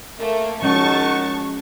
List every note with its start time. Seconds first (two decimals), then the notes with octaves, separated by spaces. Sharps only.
0.18 A3 A#3
0.62 D#3 F3 G#3 C#4 D#4 F#4 A5 C#6